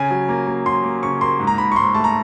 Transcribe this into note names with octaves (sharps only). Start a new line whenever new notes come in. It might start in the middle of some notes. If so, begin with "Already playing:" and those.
Already playing: C#3 G#5
F#3
A#3
A#3
F#3 C6
A#3
C#3 C#6
A#3 C6
G#2
A#5
G#2 B5
C#6
G#2 C6
A3 A5
A#5